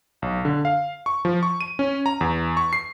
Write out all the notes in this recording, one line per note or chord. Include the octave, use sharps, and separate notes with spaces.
B1
D3
F5
C#6
F3
C#6
D#7
C#4
A#5
E2
C#6
C7